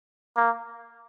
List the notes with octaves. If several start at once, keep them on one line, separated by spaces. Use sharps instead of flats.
A#3